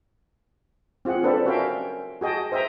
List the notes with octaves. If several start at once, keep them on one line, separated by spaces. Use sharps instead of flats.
C4 F4 G#4 F#5
C4 D4 A4 B4 C5 D5
C#4 F#4 A#4 E5 F5 G5
F#4 G#4 D#5 G5 A5
C5 D#5 E5 G5 A#5